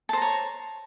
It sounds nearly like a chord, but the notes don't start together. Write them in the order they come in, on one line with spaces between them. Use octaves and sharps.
A5 C5 A#5 C#5